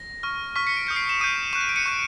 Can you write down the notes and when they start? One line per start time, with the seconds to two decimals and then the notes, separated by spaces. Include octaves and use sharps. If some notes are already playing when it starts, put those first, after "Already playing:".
Already playing: A#6
0.23 C#6 F6
0.56 C#6 F6 B6
0.67 B6 C#7
0.77 D7
0.87 D#6 G6 C#7
0.96 C7 D7
1.09 E7
1.20 D#6 G6 C#7 D#7
1.53 C#6 F#6 E7
1.61 D#7
1.69 D7
1.76 C#7 D#7
1.86 C#6 F#6